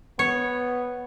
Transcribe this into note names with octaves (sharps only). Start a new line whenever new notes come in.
B3 C#5